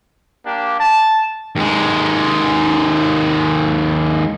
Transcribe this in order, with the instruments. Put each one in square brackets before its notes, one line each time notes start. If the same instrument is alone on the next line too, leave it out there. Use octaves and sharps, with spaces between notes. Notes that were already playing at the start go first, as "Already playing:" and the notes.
[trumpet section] A#3 D4 G4
A5
[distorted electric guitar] D#2 G#3